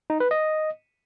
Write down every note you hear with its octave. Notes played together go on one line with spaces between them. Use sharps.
D#4
B4
D#5